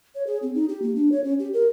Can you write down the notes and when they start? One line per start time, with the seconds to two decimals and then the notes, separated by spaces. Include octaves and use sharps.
0.15 C#5
0.27 G#4
0.42 C4
0.55 D#4
0.69 G4
0.82 A#3
0.96 D4
1.12 C#5
1.24 C#4
1.39 G4
1.53 A#4